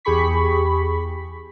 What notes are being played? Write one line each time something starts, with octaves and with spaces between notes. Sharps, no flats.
E2 G4 G#4 B5 C#6 B6